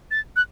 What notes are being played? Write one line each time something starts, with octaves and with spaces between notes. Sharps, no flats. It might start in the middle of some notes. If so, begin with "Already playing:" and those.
A6
F#6